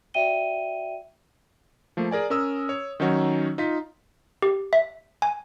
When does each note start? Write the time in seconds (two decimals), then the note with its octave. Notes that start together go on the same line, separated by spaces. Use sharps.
0.14 F#4 D5 E5 G5 D#7 G7
1.97 F3 A3 A#3
2.11 G#4 A#4 D5 G#5
2.30 C#4 A#4 D#6 E6
2.69 C#5
3.00 D#3 F#3 C#4 D#4 F#4 C#5
3.58 D#4 F4 B6
4.42 G4
4.73 E5
5.22 G#5